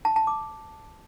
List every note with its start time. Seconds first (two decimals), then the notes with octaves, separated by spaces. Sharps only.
0.05 A5
0.16 A5
0.27 D6